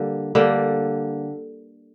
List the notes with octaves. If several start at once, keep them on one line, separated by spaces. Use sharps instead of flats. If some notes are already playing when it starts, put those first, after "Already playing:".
Already playing: D3 G3 A#3
D3 G3 A#3